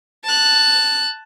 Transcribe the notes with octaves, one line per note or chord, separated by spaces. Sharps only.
A5 F#6